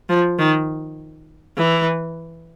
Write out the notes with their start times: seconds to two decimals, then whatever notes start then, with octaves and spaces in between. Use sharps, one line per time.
0.09 F3
0.39 D#3
1.57 E3